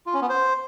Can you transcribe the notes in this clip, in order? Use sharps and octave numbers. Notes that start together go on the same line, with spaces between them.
F4
C#4
B3
C5